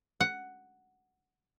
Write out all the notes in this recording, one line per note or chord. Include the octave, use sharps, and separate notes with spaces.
F#5